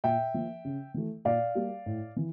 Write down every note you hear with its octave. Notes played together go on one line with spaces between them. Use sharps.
A#2 E5 G5
F3 A#3
C#3
E3 A3
A#2 D5 F5
G3 A#3
A2
E3